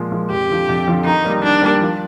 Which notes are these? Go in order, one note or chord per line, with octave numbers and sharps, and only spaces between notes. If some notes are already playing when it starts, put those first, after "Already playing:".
Already playing: A#2 F3 G#3
F3 G#3
F2 G4
D3 F3
F2
D3 F3
D#3 D#4
G3 A#3
D#3 D4
G3 A#3
F3